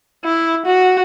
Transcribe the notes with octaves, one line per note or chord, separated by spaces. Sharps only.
E4
F#4